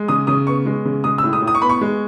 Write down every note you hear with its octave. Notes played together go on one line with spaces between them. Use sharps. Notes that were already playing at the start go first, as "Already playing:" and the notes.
Already playing: G#3
C#3 D#6
C#3 D#6
B3 C#6
G#3
C#3
G#3 D#6
E6
A2
D#6
A2
D#6
C#6
B3 B5
C#6
G#3